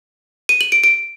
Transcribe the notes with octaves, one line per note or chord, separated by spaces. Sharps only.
D#7
F#7
D7
D7